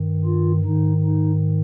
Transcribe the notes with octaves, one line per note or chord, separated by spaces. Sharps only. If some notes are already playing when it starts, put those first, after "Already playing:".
Already playing: G2 D#3
F4
G#2 D#3 D#4
D#4